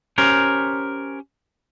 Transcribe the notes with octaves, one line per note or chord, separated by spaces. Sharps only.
C#4 G4 A#4 C5 C#5